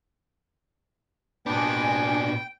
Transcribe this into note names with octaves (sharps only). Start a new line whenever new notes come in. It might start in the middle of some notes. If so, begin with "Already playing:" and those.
A#2 B3 D4 G5 G#5